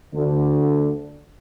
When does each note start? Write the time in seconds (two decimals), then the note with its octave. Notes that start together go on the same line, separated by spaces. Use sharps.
0.14 D2 D3